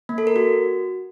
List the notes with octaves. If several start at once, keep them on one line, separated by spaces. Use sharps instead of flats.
A#3
A4
A#4
F#4